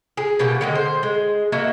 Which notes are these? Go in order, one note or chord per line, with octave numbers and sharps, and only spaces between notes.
G#4
B2 A#3 G4 F#5
D3 D#3 G#3
C5
G#3
A#3 F#4 D#5 E5